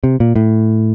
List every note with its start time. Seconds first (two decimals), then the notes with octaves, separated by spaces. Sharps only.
0.04 C3
0.20 A#2
0.36 A2